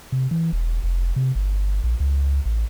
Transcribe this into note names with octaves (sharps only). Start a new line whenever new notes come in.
C3
E3
E1
F1
C3
G1
A#1
C#2
A1